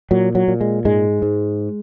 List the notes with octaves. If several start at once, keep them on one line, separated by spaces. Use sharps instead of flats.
A#2 F#3
F#3
A#2
G#3
G#2 G#3
G#2